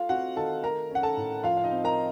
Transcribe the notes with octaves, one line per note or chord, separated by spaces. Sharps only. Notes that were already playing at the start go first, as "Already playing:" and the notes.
Already playing: A3 F4 F5
C4 F#4 F#5
D#3 A4 A5
A3 A#4 A#5
C#4 F#5
A4 A5
A2
F3 F4 F5
F5
D#4 D#5
C4
A#4 A#5